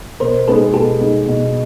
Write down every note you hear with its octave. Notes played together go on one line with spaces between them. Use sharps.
B2 A#4 C5
G#3 B3 D#4 A4 B4
B2 G4 A4
G#3 B3 D#4
B2